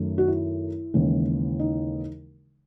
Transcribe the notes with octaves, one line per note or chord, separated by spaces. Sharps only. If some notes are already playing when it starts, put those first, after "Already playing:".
Already playing: F#2 D#3 F#3 A3
F#4
E4
D#2 C#3 E3 G#3
D#4